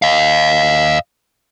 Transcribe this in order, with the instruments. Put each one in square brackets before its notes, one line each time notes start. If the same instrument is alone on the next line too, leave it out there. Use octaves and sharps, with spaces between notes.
[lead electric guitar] D#5 F5